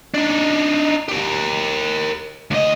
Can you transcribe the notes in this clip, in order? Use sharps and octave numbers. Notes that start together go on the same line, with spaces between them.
D4 D#4
G4 A#4
D2 D#5